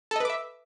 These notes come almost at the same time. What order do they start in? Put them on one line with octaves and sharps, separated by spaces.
A4 D#5 B4 D6 E5